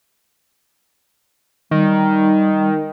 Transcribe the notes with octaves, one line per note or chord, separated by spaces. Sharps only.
D#3 G3